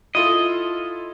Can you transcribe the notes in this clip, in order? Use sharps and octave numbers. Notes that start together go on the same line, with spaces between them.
E4 F4 A4 D#5